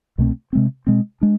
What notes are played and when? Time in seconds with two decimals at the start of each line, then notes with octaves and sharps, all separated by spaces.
0.18 C2 B2 A3 C4
0.53 C3 G#3 C4
0.87 B2 G#3 C4
1.21 G#3 D4